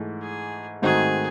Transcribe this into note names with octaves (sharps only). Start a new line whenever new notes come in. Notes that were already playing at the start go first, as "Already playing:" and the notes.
Already playing: G#2 E3 A3
G#4
G#2 D#3 A3 C4 F#4 G#4